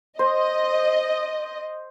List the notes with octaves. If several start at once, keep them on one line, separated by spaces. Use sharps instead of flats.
C5 D#5